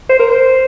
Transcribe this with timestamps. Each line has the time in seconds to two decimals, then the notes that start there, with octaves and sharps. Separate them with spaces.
0.09 C5
0.19 A#4
0.30 C5